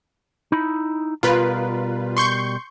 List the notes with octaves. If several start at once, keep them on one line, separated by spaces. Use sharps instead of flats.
D#4 E4 B5
B2 G3 F4 A#4 B4
C6 C#6 G6